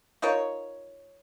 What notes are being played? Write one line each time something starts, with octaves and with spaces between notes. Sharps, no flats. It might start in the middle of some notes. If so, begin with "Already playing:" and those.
D#4 F4 A#4 C#5